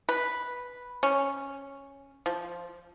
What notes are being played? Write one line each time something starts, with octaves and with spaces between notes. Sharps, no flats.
B4
C#4
F3